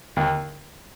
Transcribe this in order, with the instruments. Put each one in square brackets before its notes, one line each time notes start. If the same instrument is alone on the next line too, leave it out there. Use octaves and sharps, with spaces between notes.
[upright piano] D#2